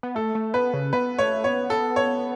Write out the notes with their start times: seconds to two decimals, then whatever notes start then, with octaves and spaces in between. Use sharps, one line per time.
0.03 B3
0.15 A3 A4
0.35 A3
0.54 B3 B4
0.73 C#3
0.93 B3 B4
1.19 A3 C#5
1.44 B3 C#5
1.70 A4
1.96 C#5